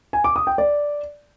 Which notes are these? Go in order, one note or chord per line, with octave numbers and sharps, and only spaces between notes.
G#5
D6
D#6
G5
D5